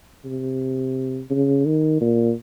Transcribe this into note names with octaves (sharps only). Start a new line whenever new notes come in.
C3
C#3
D#3
A#2